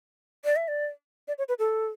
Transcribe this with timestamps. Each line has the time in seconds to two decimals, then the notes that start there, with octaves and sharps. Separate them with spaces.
0.45 D5
0.56 E5
0.68 D5
1.28 D5
1.38 C#5
1.49 B4
1.59 A4